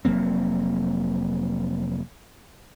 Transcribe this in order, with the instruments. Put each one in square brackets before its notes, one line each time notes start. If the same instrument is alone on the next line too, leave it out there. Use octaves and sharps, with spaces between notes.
[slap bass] F1 F#3 A#3 C4